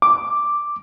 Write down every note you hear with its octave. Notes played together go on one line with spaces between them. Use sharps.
D6